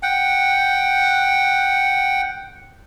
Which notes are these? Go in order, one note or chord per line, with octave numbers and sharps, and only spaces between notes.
F#5 G5